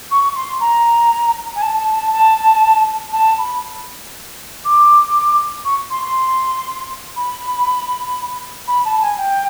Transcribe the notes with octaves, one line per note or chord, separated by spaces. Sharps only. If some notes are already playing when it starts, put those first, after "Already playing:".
C#6
C6
A#5
G#5
A5
A5
A5
A5
A5
B5
D6
C#6
C6
C6
B5
B5
A5
G#5
G5